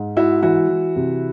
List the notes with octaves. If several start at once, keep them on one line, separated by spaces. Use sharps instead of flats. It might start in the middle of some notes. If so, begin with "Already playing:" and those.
Already playing: G#2
G#3 E4 F#4
E3 E4 F#4
E3
C3